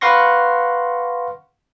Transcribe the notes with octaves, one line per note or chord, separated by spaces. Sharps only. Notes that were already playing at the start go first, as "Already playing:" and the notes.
B4 F5 F#5 C6 C#6 A#6